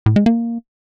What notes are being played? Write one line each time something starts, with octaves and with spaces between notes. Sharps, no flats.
A2
G#3
A#3